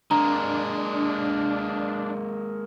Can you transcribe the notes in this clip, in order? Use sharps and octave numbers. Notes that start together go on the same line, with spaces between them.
G#3 A#3 D4 A#5